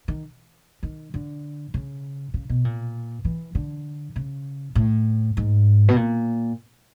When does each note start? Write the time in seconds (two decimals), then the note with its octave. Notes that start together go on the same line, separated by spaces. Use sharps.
0.08 D#3
0.83 D#3
1.14 D3
1.74 C#3
2.34 C#3
2.49 B2
2.65 A#2
3.25 E3
3.55 D3
4.16 C#3
4.75 A2
5.37 G#2
5.88 B2
5.96 A#2